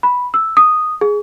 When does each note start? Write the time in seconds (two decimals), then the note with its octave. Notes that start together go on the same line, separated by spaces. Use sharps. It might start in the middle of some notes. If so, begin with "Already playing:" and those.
0.03 B5
0.34 E6
0.57 D#6
1.01 G#4